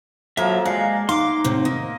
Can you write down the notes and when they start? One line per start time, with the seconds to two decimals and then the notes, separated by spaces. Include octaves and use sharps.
0.37 F3 F#3 A#3 A4 A#4 E5
0.65 G#3 D5 F5 F#5
1.09 D#4 F5 C6 D6
1.44 A2 C3
1.65 A#3 D#5